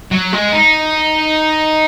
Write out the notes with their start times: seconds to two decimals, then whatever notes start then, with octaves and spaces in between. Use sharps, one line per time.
0.11 F#3
0.33 G#3
0.53 D#4